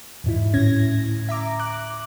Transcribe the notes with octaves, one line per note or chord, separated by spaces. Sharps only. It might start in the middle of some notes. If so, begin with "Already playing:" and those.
E2 G#2 E4
D2 A2 C#4 G#6 A#6
E5 A#5 D6
D6 F#6